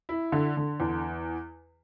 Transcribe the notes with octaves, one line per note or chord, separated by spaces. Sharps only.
E4
D3
D3
E2